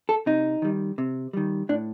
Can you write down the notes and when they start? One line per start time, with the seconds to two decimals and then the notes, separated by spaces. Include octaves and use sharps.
0.09 A4
0.26 C3 D#4
0.62 D#3 G3
0.98 C3
1.33 D#3 G3
1.69 A2 D4